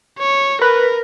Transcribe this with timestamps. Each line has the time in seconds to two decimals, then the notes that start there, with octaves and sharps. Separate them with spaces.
0.19 C#5
0.62 A#4 B4